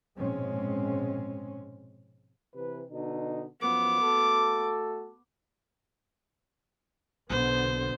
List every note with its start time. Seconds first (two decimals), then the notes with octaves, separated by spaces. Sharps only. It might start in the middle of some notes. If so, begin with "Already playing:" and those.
0.17 A#1 G#2 B2 G#3 C4 C#4
2.53 C3 E3 B4
2.88 B2 D3 D#4
3.61 F#2 F3 B3 D6
4.00 A3 F#4 A4
7.30 B1 B2 D3 B3 C5